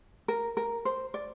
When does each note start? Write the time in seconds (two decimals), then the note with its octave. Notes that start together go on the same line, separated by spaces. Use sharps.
0.28 A#4
0.57 A#4
0.85 C5
1.14 D5